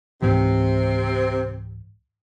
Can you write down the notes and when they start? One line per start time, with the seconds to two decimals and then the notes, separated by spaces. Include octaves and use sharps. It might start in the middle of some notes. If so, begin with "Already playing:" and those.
0.22 C#2 G#2 C3 E3 C4